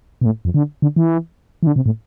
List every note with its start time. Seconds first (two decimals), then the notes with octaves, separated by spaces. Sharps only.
0.21 B2
0.26 A2
0.45 F2
0.54 D3
0.82 D3
0.96 E3
1.63 E3
1.67 D3
1.76 C3
1.86 A2